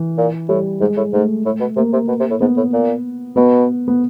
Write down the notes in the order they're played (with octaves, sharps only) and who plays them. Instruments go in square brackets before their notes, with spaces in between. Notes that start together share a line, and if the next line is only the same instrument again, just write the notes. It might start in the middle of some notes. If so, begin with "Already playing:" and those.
Already playing: [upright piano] E3
[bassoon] A#2
[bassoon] A2 [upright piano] G3
[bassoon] G#2 [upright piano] G#3
[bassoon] A2
[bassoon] G#2 [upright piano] A3
[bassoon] A2
B2
[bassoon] C3 [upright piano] A#3
[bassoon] C3
B2
C3
A2
[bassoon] G#2 [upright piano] B3
[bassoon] A2
A#2
[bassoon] B2 [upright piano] B3
[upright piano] B3